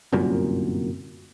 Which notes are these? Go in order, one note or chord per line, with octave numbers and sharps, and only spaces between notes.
G1 C2 F#2 A#2